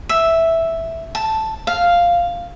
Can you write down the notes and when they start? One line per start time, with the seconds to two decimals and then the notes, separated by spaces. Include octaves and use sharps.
0.09 E5
1.15 A5
1.67 F5